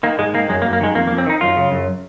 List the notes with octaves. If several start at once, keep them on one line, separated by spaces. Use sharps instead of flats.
D#3 A#3
G#2 G#3
D#3 A#3
F#2 G#3
A#3
F#2
A#3
D#3 G#3
F2 A#3
A#3
F2
C4
D#3 D#4
F#2 F4
C#3
F#2